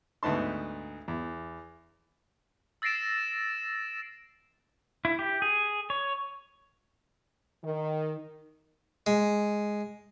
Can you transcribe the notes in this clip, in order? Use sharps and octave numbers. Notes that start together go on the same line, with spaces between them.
D2 G#2 B3 D#4 A5 C6
E2
E6 A6 A#6 C7 D7 E7
E4
G4
G#4
C#5
D#3
G#3